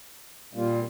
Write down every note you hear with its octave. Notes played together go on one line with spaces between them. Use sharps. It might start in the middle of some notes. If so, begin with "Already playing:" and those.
A#2 G3 A#3 F4